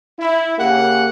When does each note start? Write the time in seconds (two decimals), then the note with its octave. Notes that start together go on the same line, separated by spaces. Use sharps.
0.19 E4
0.58 C#3 A#3 G4 F#5